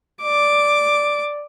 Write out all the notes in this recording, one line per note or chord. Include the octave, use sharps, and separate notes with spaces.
D5 D6